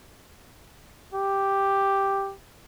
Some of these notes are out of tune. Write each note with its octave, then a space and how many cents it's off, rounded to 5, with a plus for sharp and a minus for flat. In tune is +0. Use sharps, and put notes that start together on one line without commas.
G4 +0